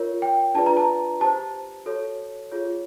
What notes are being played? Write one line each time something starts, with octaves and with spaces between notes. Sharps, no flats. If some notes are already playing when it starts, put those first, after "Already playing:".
Already playing: F4 A#4 C#5
G5
D4 F4 G#4 B4 D5 A5
A#5
A5
G4 C5 A5
F#4 A4 C#5
F4 G#4 C#5